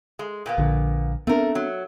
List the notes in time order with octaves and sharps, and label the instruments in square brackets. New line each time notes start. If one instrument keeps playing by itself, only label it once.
[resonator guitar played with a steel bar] G#3
A#2 A#3 B3
[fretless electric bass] A#1 D3
[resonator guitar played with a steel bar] A3 A#4 [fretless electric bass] B3 C4 D4
[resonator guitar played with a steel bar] F#3